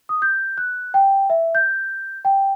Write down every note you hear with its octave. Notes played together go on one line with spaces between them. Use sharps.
D#6
G6
F#6
G5
E5
G6
G5